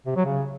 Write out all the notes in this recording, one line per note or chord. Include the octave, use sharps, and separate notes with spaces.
C3
F#3
C#3